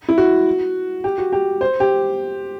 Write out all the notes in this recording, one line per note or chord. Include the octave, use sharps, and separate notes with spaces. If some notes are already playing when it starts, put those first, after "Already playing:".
E4
F#4
G4
F#4
G4
C5
G4